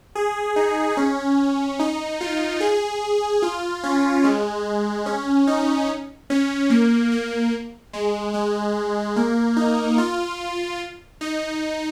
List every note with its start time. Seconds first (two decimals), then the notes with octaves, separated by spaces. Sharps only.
0.15 G#4
0.56 D#4
0.97 C#4
1.79 D#4
2.21 F4
2.60 G#4
3.42 F4
3.84 C#4
4.24 G#3
5.06 C#4
5.47 D#4
6.30 C#4
6.70 A#3
7.12 A#3
7.93 G#3
8.34 G#3
9.16 A#3
9.57 D#4
9.98 F4
11.21 D#4